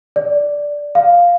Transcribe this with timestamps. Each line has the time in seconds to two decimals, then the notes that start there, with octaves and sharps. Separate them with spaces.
0.16 D5
0.95 F5